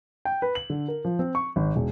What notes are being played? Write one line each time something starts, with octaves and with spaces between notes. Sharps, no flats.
G5
B4
F#7
D3
A#4
F3
C4
C#6
G#1
E1